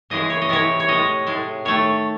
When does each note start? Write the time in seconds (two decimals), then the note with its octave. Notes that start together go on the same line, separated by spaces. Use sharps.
0.10 C#3 E3 G#3 D#5
0.30 C#5
0.42 D#5
0.49 C3 E3 G#3 C#5
0.80 C#5
0.88 A2 G#3 D#5
1.27 A2 G#3
1.65 D#3 A3 C#5